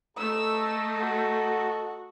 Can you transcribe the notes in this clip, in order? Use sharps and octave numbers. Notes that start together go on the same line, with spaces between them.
A3 A4 D#5 A#5 E6
F#4